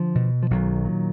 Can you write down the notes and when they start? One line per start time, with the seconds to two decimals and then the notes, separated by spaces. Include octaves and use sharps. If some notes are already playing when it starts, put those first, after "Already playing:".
Already playing: D3 F3
0.15 B2
0.43 F3
0.51 B1 D#3 F#3
0.85 A#2